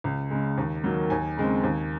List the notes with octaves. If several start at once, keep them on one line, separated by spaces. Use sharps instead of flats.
C#2
C#3 G#3
D#2
D#3 F#3 A#3
D#2 G#5
C#3 G#3 C4
D#2